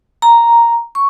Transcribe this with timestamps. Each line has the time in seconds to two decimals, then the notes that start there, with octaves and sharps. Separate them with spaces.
0.22 A#5
0.95 C#6